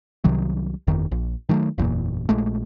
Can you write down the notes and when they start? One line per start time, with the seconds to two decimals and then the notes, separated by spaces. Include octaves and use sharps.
0.24 C2 C3 D#3 F#3
0.87 G1 F2 D#3
1.11 A#1
1.49 D#3 F#3 G#3 A3
1.78 F#1 E2 G2 A#2
2.29 A#1 G#3 A3